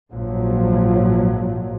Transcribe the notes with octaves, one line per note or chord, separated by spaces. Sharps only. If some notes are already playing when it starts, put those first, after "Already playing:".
A#1 G#2 F3 F#3